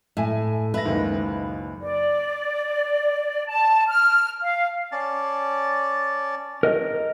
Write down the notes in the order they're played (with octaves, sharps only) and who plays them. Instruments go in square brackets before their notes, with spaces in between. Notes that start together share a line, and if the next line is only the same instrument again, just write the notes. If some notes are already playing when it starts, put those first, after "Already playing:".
[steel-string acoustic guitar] A2 [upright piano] E5 G#5
[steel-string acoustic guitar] B4 [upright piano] E5 A#6
[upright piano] F#1 C#2 D#3
[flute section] D5
A5
F6
F5
[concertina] C#4 D5 A5
[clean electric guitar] A#4 D#5